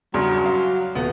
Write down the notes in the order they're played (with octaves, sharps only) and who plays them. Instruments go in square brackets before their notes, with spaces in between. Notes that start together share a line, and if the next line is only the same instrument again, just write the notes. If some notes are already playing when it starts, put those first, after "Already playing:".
[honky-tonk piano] E2 G2 C#3 [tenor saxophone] F#3 [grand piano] A#5 C6
[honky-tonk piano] F5
[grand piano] D#1 [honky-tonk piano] B3